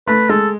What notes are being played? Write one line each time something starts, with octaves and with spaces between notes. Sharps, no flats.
A3 B4
G#3 A4